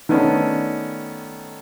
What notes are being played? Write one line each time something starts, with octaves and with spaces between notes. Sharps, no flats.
D#3 A3 B3 C#4 D4